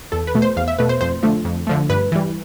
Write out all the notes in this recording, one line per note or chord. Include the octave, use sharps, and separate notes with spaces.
E2 A4
B4
B2 A3
C5
E2 F5
E5
B2 A3 B4
C5
F2 C5
D3 F3 A3
F2
D3 F3 A3
G2 B4
E3 G3